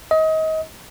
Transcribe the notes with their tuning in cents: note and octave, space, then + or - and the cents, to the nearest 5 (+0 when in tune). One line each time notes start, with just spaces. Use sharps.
D#5 +30